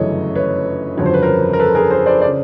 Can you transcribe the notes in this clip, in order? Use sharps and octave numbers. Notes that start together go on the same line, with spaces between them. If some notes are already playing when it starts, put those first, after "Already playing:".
Already playing: G1 F#2 C#3 E3 A3 C#5 D#5
B4 C#5
G1 F2 C#3 F#3 C#5
C5
B4
A#4 C5
A#4
A4 B4
G#4 A#4
A#4 C5
C5 D5
C5 D5
C#3